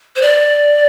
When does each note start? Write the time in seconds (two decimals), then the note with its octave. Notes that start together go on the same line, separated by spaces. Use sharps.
0.16 C5
0.22 D5